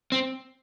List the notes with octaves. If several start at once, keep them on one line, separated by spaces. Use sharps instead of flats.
C4